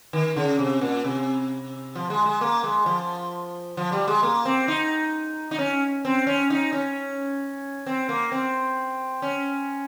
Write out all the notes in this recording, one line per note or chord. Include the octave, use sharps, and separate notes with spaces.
D#3
C#3
C3
A#2
C3
F3
G#3
G#3
A#3
G#3
F3
F3
G3
G#3
A#3
C4
D#4
D#4
C#4
C4
C#4
D#4
C#4
C4
A#3
C4
C#4